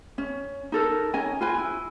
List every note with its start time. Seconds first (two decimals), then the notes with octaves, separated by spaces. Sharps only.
0.18 C#4
0.72 D#4 A4 A#4
1.14 C#4 D#5 G#5 A#5
1.41 F4 B4 G#5
1.58 E4